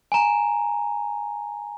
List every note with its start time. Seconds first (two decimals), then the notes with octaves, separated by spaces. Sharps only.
0.12 G#5 A#5